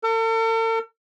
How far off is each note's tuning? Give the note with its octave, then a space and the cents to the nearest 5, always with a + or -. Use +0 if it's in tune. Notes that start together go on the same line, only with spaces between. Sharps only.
A4 +45